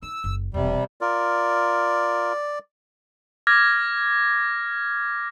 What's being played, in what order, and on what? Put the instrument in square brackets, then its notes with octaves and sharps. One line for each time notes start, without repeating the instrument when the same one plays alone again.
[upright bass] D#4 [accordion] E6
[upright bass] F#1
[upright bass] E1 E3 [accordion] C3 G3
[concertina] F4 A#4 [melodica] D5
[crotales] D6 F6 G#6 A#6